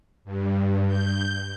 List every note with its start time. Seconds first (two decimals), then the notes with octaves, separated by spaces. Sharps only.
0.25 G2
0.87 G6